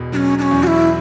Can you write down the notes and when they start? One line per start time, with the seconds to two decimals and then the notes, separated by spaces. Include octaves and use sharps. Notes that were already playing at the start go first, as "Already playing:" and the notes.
Already playing: E1 E2 B2
0.12 F#3 D4
0.16 C#4
0.38 D4
0.42 C#4
0.51 E2
0.63 F#4
0.67 E4